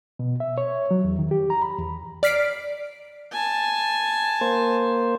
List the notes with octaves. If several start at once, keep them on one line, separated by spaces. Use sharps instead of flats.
B2
E5
C#5
F#3
E2
D#3
G4
A#5
B5
E2
D5 F6 B6 C7 D7
G#5 A5
A#3 C5